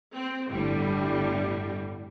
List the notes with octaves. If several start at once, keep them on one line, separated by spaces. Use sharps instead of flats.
C4
G1 A2 D3 G3